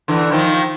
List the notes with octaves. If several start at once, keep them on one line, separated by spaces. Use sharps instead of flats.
D3 E3
D#3 F3